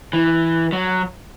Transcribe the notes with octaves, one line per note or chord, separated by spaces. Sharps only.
E3
F#3